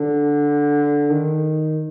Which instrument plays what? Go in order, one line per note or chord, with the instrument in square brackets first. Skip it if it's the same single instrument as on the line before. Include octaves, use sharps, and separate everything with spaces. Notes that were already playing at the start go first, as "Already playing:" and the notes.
Already playing: [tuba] D3
D#3